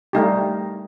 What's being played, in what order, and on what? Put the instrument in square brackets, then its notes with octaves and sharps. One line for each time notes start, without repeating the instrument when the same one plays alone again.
[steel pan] G3 A3 D#4 G4